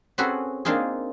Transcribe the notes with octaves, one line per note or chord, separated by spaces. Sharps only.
C4 C#4 F#4 G#4 A4 B4
A#3 C4 D4 D#4 F4 G#4